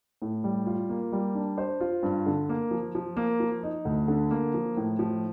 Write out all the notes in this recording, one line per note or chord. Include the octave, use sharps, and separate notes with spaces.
A2
G3
F4
A#3
G3
D4
C5
F4
G2
D3
A#3
F3
F3
A#3
F3
D#4
D2
D3
A#3
F3
A2
F3